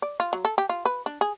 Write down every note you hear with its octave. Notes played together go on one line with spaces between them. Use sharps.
D5
F4
F#3
A4
G4
F4
B4
D4
G#4